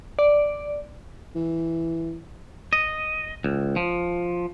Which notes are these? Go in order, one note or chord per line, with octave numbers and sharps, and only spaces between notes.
D5
E3
D#5
C#2
F3